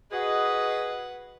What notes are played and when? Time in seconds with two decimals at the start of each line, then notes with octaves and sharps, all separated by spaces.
0.12 F#4 G#4 B4 D#5 F#5